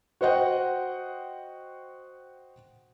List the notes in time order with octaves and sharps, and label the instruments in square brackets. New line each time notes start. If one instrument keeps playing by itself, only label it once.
[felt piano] F#4 C5 D#5 F#5 G5